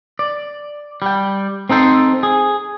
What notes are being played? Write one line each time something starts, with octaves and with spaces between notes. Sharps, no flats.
D5
G3 G5
C4 D#4 A4 C5
G#4